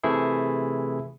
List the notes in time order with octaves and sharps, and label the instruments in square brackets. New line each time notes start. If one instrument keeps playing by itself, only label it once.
[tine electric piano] C3 E3 A3 E4 G#4